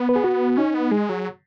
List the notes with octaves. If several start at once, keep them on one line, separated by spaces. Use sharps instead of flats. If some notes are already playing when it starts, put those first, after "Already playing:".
Already playing: B3
B4
G#4
F#4
C#4 D#4
B3
G#3 G#4
F#3